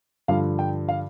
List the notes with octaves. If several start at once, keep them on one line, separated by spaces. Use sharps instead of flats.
G2 D3 F3 F5
G5
F5